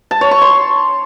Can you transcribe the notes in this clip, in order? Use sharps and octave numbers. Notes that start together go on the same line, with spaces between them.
A5
C#5
C#6
C6